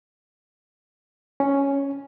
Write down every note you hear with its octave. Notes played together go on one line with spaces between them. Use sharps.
C#4